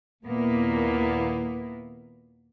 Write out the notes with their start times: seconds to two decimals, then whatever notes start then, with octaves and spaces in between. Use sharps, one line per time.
0.24 D#2 A#2 A#3 B3 E4